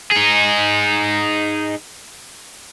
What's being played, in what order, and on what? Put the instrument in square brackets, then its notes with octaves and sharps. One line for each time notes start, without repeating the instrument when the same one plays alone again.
[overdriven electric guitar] D#4 G#4